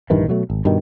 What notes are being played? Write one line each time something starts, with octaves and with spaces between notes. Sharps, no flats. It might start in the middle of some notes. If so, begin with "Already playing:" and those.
A#1 G2 D#3 E3
B2 F#3 A3
G#1
G2 B2 D#3